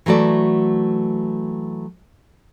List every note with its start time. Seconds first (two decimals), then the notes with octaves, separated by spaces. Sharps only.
0.06 E3 F#3 A3 F#4 D5